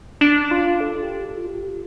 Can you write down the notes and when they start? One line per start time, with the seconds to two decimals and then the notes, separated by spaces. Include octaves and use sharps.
0.21 D4
0.51 F4
0.80 A4
1.03 G4
1.25 A4
1.37 F4
1.47 G4
1.69 F4